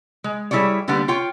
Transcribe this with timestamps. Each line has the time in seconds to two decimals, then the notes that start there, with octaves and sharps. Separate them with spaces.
0.24 G#3
0.51 G3 E4 G#4 C#5 D5
0.88 D3 G3 A#3 B3 D4
1.08 F4 C#5 G5